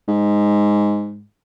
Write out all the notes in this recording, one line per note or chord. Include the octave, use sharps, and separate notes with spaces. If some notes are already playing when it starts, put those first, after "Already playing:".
G#2